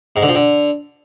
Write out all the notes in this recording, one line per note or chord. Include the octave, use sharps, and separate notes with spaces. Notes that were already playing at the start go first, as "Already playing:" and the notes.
G#2
D3
F3
D3